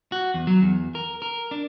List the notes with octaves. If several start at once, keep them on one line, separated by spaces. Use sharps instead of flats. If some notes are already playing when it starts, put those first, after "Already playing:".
F#4
E2
F#3
E2
A#4
A#4
D4